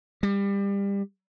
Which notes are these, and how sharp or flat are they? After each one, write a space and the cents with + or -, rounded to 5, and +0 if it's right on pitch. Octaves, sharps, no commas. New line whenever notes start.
G3 +25